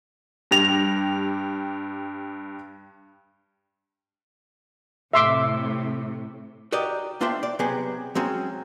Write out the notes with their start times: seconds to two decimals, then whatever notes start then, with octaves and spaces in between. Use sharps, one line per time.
0.51 G2 G4 A#6 F7
5.13 A2 C3 E5 C6 D6
6.72 F#4 G4 A#4 D5 D#5
7.21 A3 D4 F4 C5 E5 G5
7.43 D5
7.59 C3 F#3 B3 G4 G#4
8.15 F#3 G#3 C4 C#4